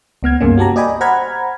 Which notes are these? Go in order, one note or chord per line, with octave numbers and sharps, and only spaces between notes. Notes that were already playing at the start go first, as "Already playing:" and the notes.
C#2 B3 F6 G#6
G2 C#3 A#3 C#4
F#4 G4 A5 A#5
D5 D#5 G5 G#5 B5
C5 F#5 A#5 B5 F6 G#6